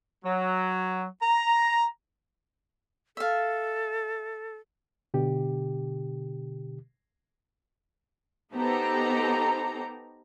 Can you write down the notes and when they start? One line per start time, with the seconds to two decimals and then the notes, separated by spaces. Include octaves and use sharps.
0.24 F#3
1.22 A#5
3.17 A4 E5 F5
5.14 B2 D3 G4
8.53 B3 D#4 G4 A4 C5 A#5